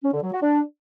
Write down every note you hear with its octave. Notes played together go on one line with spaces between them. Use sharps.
C#4
D3
F#3
F#4
D4